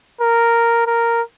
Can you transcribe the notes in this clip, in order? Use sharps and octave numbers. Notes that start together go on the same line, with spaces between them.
A#4
A#4